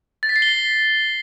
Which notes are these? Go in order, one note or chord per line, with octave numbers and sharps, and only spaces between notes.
A6
B6
C7
G7
B6